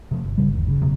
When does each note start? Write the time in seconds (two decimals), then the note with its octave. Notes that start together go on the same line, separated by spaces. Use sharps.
0.11 C3 F3 A3
0.24 G1
0.38 G2 C#3 G3
0.53 E1 D#2
0.68 C#3
0.82 F1 B2 F#3